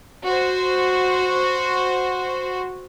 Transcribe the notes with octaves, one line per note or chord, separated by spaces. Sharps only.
F#4 C5